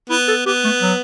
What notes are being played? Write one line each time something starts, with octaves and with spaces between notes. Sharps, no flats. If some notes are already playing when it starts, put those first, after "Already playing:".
B3 E4
A4
B3 G4
A3
F#3